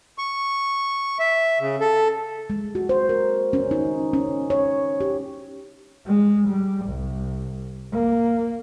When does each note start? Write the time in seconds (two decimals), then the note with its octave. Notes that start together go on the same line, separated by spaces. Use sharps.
0.18 C#6
1.19 E5
1.60 C#3
1.80 A4
2.50 G#3
2.75 F#4
2.89 C5
3.09 A#4
3.53 C#4
3.71 D#4
4.13 C#4
4.50 C#5
5.01 G4
6.06 G#3
6.48 G3
6.86 C2
7.92 A#3